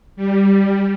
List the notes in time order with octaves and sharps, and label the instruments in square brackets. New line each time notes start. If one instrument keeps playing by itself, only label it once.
[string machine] G3